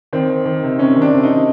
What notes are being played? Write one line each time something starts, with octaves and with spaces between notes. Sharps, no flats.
D#3 C4
D#3
D#3
C3
C3 C#4
D#3
D4
C3
D#4
D#3